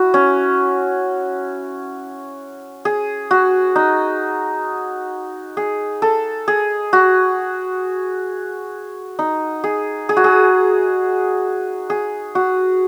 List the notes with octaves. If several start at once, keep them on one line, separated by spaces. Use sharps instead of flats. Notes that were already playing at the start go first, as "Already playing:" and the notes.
Already playing: E4 F#4
C#4
G#4
F#4
D#4
G#4
A4
G#4
F#4
D#4
G#4
G#4
F#4
G#4
G#4
F#4